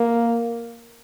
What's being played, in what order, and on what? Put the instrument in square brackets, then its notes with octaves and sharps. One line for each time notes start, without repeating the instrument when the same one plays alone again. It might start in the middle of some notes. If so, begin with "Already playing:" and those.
Already playing: [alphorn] A#3